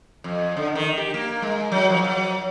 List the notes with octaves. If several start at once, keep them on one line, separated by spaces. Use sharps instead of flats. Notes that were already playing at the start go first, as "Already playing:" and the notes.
F2
D3
D#3
G4
A#3
G#3
F#3
F3
F#3